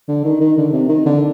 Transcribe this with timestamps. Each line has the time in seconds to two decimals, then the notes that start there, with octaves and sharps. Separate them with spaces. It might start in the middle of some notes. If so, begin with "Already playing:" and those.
0.08 D3
0.25 D#3
0.41 D#3
0.57 D3
0.73 C3
0.89 D#3
1.06 D3